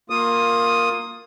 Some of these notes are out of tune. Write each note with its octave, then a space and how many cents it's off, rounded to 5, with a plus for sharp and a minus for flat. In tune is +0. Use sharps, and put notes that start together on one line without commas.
A#3 +0 F4 +15 D#6 +0